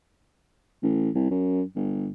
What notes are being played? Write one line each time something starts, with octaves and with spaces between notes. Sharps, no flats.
A1
C2
F#2
G1